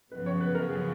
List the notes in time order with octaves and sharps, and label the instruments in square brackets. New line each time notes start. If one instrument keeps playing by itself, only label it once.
[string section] F#2 C#3 F3 B3 [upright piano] B4
[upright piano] C#5
B4
A#4
G#4